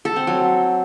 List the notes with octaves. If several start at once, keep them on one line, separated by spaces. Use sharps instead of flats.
A4
C4
F#3